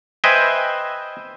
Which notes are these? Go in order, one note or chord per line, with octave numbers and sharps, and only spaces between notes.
B4 C5 D#5 E5 G5 G#5